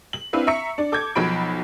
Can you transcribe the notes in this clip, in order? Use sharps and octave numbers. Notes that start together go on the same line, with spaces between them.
F#7
C4 D4 E4 B4 F5
E5 A#5 C#6 C#7
D4 D5
A4 D6 G6 G#6
B1 F3 F#3 B5 D7